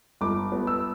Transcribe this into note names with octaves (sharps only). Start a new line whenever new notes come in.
G1 D6
B3
E6